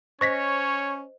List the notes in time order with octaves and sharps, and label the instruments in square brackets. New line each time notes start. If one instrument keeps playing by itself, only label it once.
[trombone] C#4 [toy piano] C5 D#5 [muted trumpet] C#5 [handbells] C#6 A#6 B6